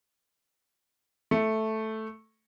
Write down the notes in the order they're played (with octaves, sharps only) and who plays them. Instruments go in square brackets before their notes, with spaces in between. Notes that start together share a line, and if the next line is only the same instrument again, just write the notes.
[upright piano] A3